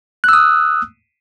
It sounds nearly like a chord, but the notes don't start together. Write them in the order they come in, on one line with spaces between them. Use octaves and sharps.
F#6 E6 D#6